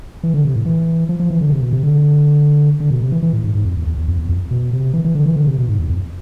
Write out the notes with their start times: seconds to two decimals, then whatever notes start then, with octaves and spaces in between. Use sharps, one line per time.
0.23 E3
0.34 D3
0.45 C3
0.56 A2
0.66 E3
1.09 F3
1.20 F3
1.30 E3
1.41 D3
1.52 C3
1.63 B2
1.73 C3
1.83 D3
2.80 D3
2.91 B2
3.02 C3
3.12 E3
3.23 E3
3.33 A2
3.44 G#2
3.55 G#2
3.65 F2
3.77 E2
3.87 E2
3.98 E2
4.08 F2
4.19 E2
4.29 F2
4.51 B2
4.73 C3
4.94 E3
5.05 E3
5.15 D3
5.26 E3
5.36 D3
5.47 C3
5.58 B2
5.69 G#2
5.79 E2
5.90 F2